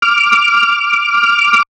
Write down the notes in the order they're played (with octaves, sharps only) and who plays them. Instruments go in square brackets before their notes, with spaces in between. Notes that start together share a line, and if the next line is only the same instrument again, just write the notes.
[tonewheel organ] D6 F6